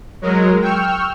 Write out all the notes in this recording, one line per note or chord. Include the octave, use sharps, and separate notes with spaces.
F#3 G#3 A#4
G5 C#6 E6 F6